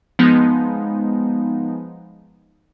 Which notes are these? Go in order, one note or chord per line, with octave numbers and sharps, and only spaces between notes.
F3 G#3 B3 D#4